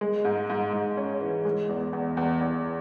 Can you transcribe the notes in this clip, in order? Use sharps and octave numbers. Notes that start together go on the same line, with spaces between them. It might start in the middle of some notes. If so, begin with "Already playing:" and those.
G#3
G#2
G#2
G#2
C#4
E3
G#3
E2
E2
E2
E2